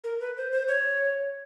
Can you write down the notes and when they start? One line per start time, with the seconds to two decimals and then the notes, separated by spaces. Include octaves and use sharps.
0.04 A#4
0.20 B4
0.37 C5
0.52 C5
0.68 C#5